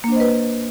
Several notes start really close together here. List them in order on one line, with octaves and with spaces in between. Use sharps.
A#3 D4 C5 D#5 B4